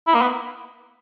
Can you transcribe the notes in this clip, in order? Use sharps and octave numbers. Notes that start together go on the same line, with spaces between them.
E4
A#3
B3